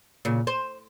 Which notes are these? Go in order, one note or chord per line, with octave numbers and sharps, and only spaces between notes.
A#2 C#3
C5